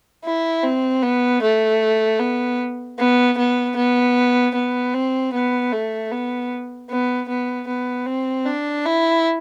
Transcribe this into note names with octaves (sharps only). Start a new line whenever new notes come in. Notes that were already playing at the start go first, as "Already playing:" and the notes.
E4
C4
B3
A3
B3
B3
B3
B3
B3
C4
B3
A3
B3
B3
B3
B3
C4
D4
E4